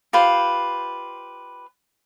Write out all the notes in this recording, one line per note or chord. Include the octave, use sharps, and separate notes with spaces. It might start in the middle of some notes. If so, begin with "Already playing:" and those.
F4 G4 B4 C5